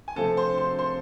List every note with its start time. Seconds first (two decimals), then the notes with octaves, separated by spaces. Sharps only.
0.08 G#5
0.16 C3 F3 A3 C4 A4 A5
0.37 C5 C6
0.58 C5 C6
0.79 C5 C6